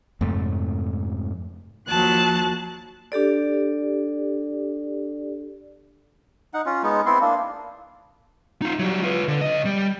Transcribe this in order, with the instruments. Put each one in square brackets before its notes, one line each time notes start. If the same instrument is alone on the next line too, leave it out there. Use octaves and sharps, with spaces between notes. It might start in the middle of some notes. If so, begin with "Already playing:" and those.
[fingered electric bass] F2 G#2 C3 A3
[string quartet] D#2 F3 F#3 A5 F#6
[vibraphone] D4 G4 A4 D5
[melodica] D#4 F#5
C#4 F4
G#3 B3 D#4
B3 C4 E4 C6
A#3 D4
[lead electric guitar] D#4 F4
F#3 G3
F4 B4
D3
C#3 D#5
G3